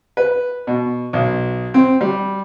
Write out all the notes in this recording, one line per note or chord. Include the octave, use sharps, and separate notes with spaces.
B4
B2
B1
C4
G3